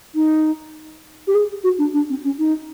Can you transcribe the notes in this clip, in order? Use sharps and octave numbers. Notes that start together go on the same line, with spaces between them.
D#4
G4
G#4
F#4
D4
D4
C4
C#4
D#4